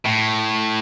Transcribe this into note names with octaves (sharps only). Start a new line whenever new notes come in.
A2